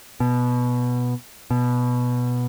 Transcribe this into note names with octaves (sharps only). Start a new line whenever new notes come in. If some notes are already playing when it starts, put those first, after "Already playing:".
B2
B2